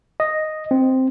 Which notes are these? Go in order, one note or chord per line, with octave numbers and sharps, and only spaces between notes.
D#5
C4